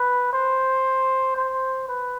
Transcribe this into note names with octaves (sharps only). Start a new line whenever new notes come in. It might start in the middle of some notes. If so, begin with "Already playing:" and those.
Already playing: B4
C5
C5
B4